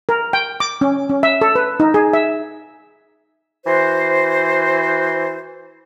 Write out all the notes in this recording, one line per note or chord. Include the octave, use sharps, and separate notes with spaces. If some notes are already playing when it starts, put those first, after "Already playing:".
A#4
G5
D6
C#4
C#4
E5
A4
B4
D#4
G#4
E5
E3 F#4 C5